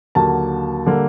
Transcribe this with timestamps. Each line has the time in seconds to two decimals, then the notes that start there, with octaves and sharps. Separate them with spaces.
0.15 D#2 D3 F#3 A#3 A5
0.87 D3 G3 A#3